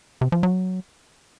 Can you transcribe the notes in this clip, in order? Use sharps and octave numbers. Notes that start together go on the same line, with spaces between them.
C3
F3
F#3